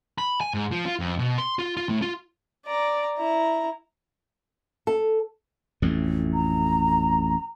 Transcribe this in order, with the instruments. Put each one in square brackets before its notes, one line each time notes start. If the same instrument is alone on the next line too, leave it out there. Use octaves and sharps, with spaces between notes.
[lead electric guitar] B5
G#5
G#2
F3
F4
F2
B2
C6
F4
F4
A2
F4
[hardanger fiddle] D5 A#5
E4 A#5
[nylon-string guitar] A4
[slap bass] A1 F2 A2
[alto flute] A#5